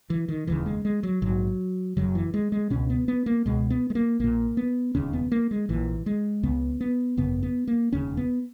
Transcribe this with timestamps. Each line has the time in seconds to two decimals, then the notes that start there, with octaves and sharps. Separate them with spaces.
0.10 E3
0.29 D#3
0.47 E1 D#2 C#3 E3
0.66 G#3
0.85 G#3
1.03 F#3
1.22 A#1 G#2 F#3
1.97 F#1 F#2 C#3 F#3
2.15 E3
2.34 G#3
2.52 G#3
2.70 C#2 B2 C#4
2.90 B3
3.08 B3
3.26 A#3
3.46 C#2 B2 G#3
3.70 B3
3.90 G#3
3.95 A#3
4.20 A#1 A#2 A#3
4.57 B3
4.95 E1 D#2 C#3 C#4
5.13 B3
5.32 A#3
5.51 G#3
5.69 A#1 A#2 E3
6.06 G#3
6.43 C#2 C#3 B3
6.81 B3
7.17 G#1 F#2 C#3 B3
7.43 B3
7.67 A#3
7.92 E1 D#2 C#3 C#4
8.17 B3